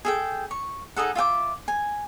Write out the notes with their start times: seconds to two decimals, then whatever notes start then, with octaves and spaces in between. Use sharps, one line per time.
0.05 G#4 A4 G5
0.51 C#6
0.96 D#4 G#4 A4 F#5
1.15 F4 E5 G5 D6
1.68 G#5